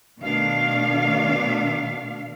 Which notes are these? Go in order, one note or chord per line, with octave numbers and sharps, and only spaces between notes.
B2 D#3 A3 D4 F5